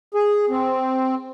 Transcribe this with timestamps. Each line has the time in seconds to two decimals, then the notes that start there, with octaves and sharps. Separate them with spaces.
0.14 G#4
0.49 C4